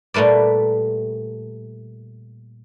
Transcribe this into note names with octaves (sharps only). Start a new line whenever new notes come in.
A#2 G3 A3 B4 D5